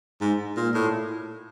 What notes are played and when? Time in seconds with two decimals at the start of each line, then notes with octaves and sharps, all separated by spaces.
0.21 G#2
0.57 A#2
0.74 A2